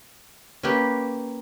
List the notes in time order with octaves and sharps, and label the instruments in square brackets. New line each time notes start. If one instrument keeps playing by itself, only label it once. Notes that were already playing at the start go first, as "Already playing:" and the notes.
[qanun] A#3 C#4 G4 B4